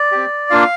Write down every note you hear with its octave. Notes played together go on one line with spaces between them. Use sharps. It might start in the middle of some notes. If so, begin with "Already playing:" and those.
Already playing: D5
C4 G4
A#3 D4 F4 F5